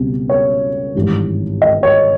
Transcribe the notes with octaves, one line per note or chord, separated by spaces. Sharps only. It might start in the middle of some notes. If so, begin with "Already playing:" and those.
Already playing: C#2 B2 G3 C4
C#5
G#1 G2 E3
D#5
C#5